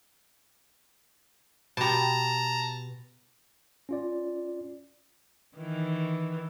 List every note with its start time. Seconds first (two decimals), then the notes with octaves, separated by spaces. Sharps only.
1.77 B2 G4 A5 A#5
3.89 C#4 F4 D5
5.57 D#3 E3